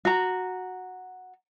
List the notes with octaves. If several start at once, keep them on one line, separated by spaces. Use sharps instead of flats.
F#4 A#5